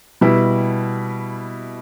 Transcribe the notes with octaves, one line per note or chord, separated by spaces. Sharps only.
B2 G3 E4